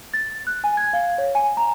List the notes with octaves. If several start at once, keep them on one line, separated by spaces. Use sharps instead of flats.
A6
F#6
G#5
G#6
F5
C#5
G#5
A#5